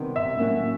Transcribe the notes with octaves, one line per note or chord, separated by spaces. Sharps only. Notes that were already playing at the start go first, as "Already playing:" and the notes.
Already playing: C3 D#3 G3 B3
E5
A2 F#3 A#3 C#4 F#4